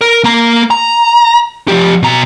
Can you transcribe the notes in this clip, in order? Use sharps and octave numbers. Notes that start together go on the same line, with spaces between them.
A#4
A#3 A#5
A#5
F3 G4
B2 A#5